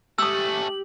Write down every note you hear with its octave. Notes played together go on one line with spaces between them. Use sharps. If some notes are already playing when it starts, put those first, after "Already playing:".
A3 C#4 G4 D#6 E6 F#7